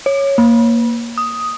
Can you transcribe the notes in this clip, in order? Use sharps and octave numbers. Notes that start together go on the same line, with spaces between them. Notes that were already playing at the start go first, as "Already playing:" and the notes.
C#5
A#3
D#6